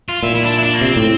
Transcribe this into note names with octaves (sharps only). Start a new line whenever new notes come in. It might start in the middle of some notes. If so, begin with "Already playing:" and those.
F4
A#2 E4
E4
D4
E4
D4
A#3
C3 C4
A2